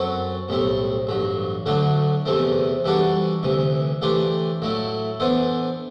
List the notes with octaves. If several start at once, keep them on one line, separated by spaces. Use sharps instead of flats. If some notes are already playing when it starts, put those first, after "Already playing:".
Already playing: F#2 F#3 C4 F#4 A4
B1 A2 G3 C4
A1 G2 F#3
D2 D3 F#3 A3 D4
E2 C3 E3 A3 C4
E3 G3 D4 F#4 A4
D2 C3 E3
E3 A3 D4 G4 C5
A2 F#3 A3 E4
E3 B3 D4 A4 C5